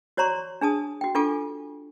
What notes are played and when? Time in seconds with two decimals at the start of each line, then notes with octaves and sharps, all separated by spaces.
0.17 F#4 C#5 D5 A#5 C6 C#6
0.61 D4 G#4 A5 D#6
1.01 F#4 G5
1.15 D4 F4 G4 A4 G#5 D6